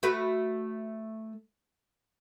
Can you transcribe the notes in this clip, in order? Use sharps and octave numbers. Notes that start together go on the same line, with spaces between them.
A3 F#4 B4